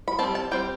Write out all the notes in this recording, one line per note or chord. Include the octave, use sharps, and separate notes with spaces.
B5
G3 C4 A5
A5
G3 C4 G5